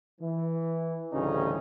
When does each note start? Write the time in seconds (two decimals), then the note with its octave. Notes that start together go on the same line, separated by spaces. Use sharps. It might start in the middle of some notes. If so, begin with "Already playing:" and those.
0.21 E3
1.13 A1 D2 C#3 G3 C#4 D#4